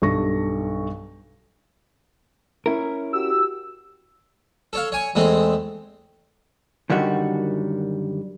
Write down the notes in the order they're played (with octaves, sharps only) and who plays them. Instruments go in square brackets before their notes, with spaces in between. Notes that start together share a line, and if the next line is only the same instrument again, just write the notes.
[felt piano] B1 G2 A4 C#6 A#6
[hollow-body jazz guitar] C#4 E4 A#4
[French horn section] F#4 G4 [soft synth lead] E6
[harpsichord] A4 C#5 F5
C#5 G#5 C#6
E2 G#3 A3 C4
[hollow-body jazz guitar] F#2 D3 D#3 G3 F#4